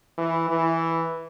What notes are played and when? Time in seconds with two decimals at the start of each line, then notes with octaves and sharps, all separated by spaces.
0.18 E3
0.50 E3